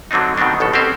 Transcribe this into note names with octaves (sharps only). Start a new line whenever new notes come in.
D3 F#3 C4 D4 D#4
B2 D#3 B3 C4 D4
A1 B2 A4
C4 C#4 G4 C5